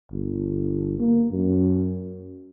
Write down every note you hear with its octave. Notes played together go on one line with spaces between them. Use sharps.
G1
A#3
F#2